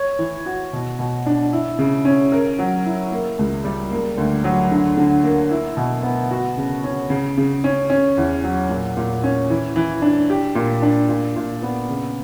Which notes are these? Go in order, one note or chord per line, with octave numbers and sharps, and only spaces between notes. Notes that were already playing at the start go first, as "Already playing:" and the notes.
Already playing: C#5
E3
F#4
B2
B2
D4
E4
C#3
C#4
A#4
F#3
E4
A#3
C#2
G3
A#3
D2
F#3
D3
D3
A#3
E4
B2
B3
F#4
C#3
C#4
C#3
C#3
C#4
C#4
E2
F#3
A#2
A#2
C#4
E3
E3
D4
G4
A#2
D4
A#2
A#2
B3
C#3